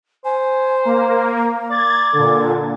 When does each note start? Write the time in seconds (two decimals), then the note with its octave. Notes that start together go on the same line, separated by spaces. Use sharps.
0.25 C5 G#5
0.85 A#3 A#5
1.70 D5 G#6 A6
2.13 A#2 D3 A4